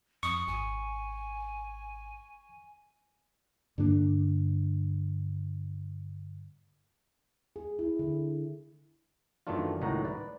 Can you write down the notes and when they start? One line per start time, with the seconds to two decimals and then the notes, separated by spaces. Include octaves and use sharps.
0.23 F2 C#6 D#6
0.47 G#1 G#5
3.78 G2 D3 A#3 D4
7.56 G#4
7.79 E4
7.99 D3
9.47 F#2 D#3 E3 A3 D4 F4
9.81 C#2 A2 D#3 F#4 A#5
10.05 B4 D5